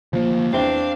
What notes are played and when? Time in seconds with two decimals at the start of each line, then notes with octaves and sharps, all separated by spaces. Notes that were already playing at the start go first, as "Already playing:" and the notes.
0.13 D2 F3 A#3
0.53 E2 C4 D4 E5 F5 G7